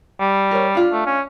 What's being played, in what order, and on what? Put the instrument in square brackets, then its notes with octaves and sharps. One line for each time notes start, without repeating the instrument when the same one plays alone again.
[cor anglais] G3
[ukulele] A#4 C#5
D4 F4
[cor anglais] A3
C#4